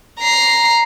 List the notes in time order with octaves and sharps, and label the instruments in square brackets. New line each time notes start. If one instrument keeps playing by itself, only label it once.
[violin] A#5 C7